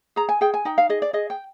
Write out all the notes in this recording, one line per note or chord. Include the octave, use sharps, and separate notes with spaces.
G#4 A#5
G#5
G#4 G5
G#5
D#4 G5
F5
G#4 D#5
D5
G#4 D#5
G5